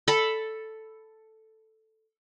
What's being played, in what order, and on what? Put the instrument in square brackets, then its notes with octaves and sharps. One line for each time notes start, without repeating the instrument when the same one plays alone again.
[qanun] A4 A5 B5